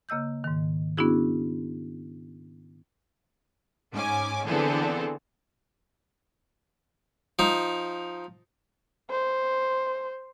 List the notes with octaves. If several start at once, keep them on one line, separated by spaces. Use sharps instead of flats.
C#3 A#3 D#5 E6 G6
G#2 D#3
B3 C#4 D4 E4 F#4 G#4
G#2 C#4 G#5 D6
D3 E3 B3 C4 G#4 A4
F3 D#4
C5